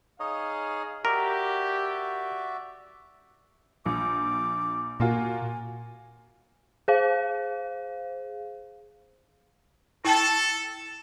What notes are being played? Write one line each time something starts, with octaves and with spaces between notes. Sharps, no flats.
D#4 G#4 C#5 D#5 F5
F#4 G4 A#4 D5 E5
A#1 D6
A#2 A#3 F4 F#4 G#5
G#4 C5 F5
E4 A4 G5 A5